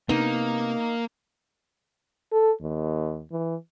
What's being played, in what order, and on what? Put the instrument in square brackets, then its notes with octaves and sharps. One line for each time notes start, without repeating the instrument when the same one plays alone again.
[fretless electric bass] C3 B3 [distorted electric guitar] A#3 [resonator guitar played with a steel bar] D#4
[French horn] A4
D#2
E3